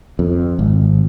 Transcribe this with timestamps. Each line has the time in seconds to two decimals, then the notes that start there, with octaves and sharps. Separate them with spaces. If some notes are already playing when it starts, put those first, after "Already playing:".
0.19 F2
0.59 G#1